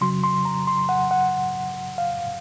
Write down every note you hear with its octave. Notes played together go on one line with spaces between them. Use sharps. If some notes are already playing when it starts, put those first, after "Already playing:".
C#3 F#3 C6
C6
A#5
C6
F#5
F#5
F5